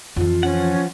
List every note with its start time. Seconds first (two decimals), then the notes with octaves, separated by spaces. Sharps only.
0.16 F2 E3 F4
0.43 F3 C#4 F#5